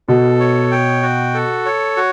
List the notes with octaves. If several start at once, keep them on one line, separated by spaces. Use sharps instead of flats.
B2 A4
C#5
G5
F#4
A4
C#5
F#4